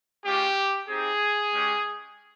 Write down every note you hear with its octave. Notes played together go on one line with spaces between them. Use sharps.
G#3 C#4 F4 G4
C4 D#4 G4 G#4
G#3 C#4 G4